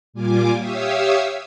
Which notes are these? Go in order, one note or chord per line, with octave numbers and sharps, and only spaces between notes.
A#2 G3 F4 G#5 D6
G4 C#5 E5 F5 D#6 E6